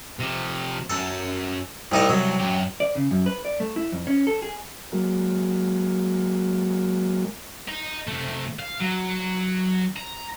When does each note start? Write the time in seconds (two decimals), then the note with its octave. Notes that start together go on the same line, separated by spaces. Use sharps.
0.19 C3 F3
0.90 F#2 A4
1.92 C2 A2 D#4 D#5
2.09 C2 F#3
2.40 F#2 G4
2.80 D5
2.95 C#3
3.11 F#2
3.26 B4
3.45 D5
3.60 A3
3.76 E4
3.92 F2
4.07 C#4
4.27 A4
4.42 G#4
4.92 F#3 G#3 A#3
7.68 D#5 A#5
8.07 C3 A3
8.59 F5
8.80 F#3
9.96 A#5